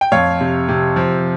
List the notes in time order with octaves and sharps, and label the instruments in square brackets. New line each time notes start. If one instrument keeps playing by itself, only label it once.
[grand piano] G5
F2 C#5 F5
C3
C3
F3